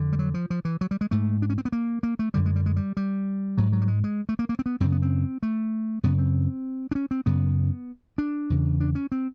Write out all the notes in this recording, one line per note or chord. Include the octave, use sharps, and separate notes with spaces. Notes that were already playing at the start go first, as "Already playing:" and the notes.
Already playing: F2 D3
G3
F#3
F3
F3
E3
F#3
G3
G#3
G#2 A3
D4
C#4
C4
B3
A#3
A#3
A3
F#2 D3 G3
G#3
G3
G#3
G3
G3
G#2 F#3
F#3
G3
G#3
G#3
A3
A#3
A#3
C4
B3
F#2 C#3 C4
B3
C4
A3
F#2 C#3 B3
C4
D4
C#4
C4
F#2 C#3 B3
D4
E2 C#3
D4
C#4
C4